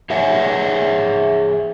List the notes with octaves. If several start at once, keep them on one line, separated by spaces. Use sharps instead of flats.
G#4 C#5 E5 F#5 G#5